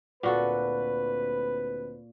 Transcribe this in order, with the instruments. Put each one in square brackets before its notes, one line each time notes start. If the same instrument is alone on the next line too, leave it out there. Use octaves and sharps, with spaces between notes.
[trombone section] D2 C4 B4 [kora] A#2 F#4 A4